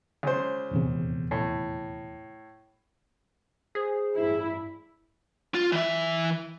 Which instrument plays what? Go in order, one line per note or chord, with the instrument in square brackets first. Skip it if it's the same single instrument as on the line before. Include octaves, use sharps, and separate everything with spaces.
[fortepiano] C#2 C5
[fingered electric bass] D#1 E2 C3
[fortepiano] A2
[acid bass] G#4 [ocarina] C5
[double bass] A1 G2 [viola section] E4
[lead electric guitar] F4
E3 E5